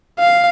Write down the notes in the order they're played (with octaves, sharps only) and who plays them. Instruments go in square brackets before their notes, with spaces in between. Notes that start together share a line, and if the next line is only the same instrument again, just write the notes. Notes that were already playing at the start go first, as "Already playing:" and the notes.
[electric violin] F5